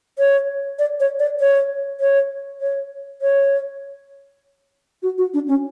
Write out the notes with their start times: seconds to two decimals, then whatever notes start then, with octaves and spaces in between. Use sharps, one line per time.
0.19 C#5
0.79 D5
1.00 C#5
1.19 D5
1.40 C#5
2.00 C#5
2.61 C#5
3.22 C#5
5.03 F#4
5.18 F#4
5.34 D4
5.48 C#4